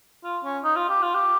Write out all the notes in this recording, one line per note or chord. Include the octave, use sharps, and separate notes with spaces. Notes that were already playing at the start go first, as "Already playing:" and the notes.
F4
C#4
D#4
F4
G4
F4
G4